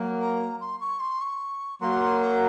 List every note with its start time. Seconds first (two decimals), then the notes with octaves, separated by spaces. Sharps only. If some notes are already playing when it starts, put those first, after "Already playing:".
Already playing: F#3 A#3
0.20 A#5
0.61 C6
0.80 C#6
1.00 C6
1.21 C#6
1.81 F#3 A#3 C6
2.21 A#5